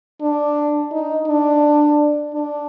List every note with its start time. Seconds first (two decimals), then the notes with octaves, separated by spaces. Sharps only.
0.21 D4
0.92 D#4
1.28 D4
2.34 D4